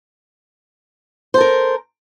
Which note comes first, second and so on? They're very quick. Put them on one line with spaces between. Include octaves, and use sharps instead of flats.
C5 A4 A#4